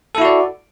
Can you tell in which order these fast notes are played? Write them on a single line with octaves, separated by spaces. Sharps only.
A4 E4 F#4 D5